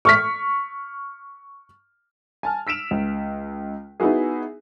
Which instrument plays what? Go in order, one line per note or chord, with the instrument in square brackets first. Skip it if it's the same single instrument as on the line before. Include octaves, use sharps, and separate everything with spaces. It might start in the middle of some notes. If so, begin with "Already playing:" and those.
[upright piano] C#6 F6 B6
G#5 A5 F6
E6 B6 D7 E7 F7
C#2
B3 D#4 E4 F#4 G#4